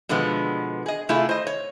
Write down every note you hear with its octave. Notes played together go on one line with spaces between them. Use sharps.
B2 D3 F3 G#3 B3
G#4 D#5
C3 A3 E4 F4 G#4
C5 D#5
C#5